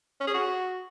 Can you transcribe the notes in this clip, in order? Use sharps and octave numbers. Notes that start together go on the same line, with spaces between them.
C#4
G#4
F#4